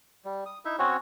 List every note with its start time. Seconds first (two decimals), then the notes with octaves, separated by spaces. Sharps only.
0.25 G3
0.46 D#6
0.65 D#4 E4 E5
0.79 C4 C#4 F#4 C#5